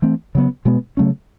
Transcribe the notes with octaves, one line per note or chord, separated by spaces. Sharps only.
E3 A3 C4
C#3 F#3 B3
B2 G#3 B3
C#3 F#3 A3 C#4